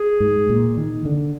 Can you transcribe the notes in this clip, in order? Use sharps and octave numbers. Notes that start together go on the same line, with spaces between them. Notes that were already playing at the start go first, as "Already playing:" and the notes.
Already playing: G#4
G#2
A#2
D#3
D3